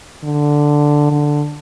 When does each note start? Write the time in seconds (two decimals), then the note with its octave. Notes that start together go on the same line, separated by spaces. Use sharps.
0.24 D3
1.11 D3